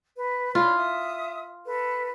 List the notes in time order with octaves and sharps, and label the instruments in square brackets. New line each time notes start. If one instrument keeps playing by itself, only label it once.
[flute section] B4
[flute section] D4 C#5 B5 [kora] F4
[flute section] E5 D#6
A4 B4